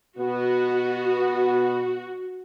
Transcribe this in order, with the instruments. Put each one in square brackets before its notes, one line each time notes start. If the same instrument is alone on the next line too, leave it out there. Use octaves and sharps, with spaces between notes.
[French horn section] B2 B3 [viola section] F#4